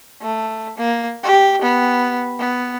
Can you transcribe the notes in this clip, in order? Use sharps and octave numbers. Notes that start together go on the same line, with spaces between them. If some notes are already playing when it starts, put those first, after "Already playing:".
A3
A#3
G4
B3
B3